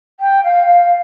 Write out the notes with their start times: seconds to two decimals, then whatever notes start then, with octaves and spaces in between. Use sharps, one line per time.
0.20 G5
0.44 F5
0.67 F5